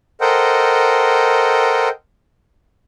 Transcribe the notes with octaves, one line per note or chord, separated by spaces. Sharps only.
A4 A#4 C5 D#5 F#5 G5